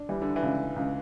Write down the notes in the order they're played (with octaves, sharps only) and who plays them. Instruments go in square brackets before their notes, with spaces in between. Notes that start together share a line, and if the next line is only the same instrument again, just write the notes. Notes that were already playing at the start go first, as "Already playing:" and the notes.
Already playing: [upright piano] D4
[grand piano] E3 [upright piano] G3
[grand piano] D3
E3
[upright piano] C#2
C#2